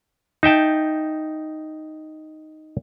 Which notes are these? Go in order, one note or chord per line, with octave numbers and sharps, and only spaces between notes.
D#4 E5 G5 A5